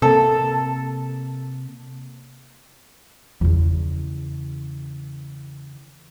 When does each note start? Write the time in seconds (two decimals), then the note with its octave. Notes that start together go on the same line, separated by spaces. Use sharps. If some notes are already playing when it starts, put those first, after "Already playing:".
0.02 C3 A#3 A4
3.41 E2 C#3